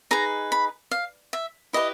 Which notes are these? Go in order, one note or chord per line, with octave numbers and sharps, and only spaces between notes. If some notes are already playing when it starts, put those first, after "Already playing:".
D#4 G#4 B4 A#5
B5
F5
E5
E4 G4 B4 D#5